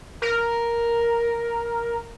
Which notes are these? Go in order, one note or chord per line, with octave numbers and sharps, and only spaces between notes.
A#4